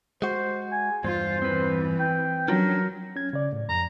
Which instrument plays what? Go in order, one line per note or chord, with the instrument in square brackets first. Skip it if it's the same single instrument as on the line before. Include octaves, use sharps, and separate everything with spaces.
[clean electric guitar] G#3 F#4 [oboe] C5
[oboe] G#5
[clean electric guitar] E2 G2 [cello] F4 [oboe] C5
[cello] E3 [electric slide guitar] C4 B4
[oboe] G5
[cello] F#3 [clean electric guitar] C#4 D4 F4 [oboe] A#4
[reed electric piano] C#4 G#6
C#3 D5
A2
[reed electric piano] F2 [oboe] A#5